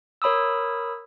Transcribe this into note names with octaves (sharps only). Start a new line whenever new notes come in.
A#4 C#5 B5 D#6 E6